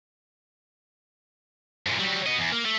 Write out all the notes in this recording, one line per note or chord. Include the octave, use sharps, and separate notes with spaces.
F#2 A#2
F#3 G3
B3 D#5
E2
A#3
A3